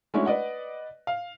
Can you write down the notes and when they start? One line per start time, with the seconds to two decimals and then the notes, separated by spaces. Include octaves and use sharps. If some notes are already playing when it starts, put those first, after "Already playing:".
0.14 G#3 A3 C#4 D4 E4 F#4
0.26 B4 D5 D#5 F#5
1.07 F5